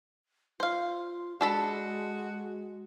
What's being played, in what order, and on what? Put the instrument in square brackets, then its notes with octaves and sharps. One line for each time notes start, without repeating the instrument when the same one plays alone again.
[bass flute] F4 [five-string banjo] C5 F5
[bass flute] G#3 [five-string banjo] D4 A4 B5 [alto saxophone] F#4